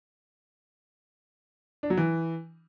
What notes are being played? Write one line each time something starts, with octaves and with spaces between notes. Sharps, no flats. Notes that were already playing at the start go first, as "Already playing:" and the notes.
D4
F#3
E3